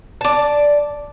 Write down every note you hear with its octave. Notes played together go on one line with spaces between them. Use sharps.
D5 A5